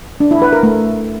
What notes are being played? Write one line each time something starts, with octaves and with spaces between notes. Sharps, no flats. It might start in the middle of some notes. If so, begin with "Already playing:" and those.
D4
E4
B4
A#4
A3